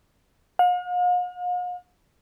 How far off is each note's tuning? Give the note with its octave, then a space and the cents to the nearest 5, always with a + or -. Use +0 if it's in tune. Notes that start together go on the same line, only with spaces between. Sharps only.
F5 +45